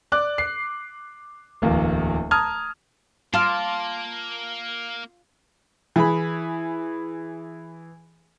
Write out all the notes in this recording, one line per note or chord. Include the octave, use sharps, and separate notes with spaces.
D5 D6 F#6
C7
D1 E2 A#3
A5 A#5 D#6 F6 G#6
A#3 F4 A5 D6 F6
E3 G#4 B5